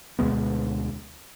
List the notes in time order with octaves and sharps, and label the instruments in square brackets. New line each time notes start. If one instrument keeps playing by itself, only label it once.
[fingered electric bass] D2 B2 G#3 B3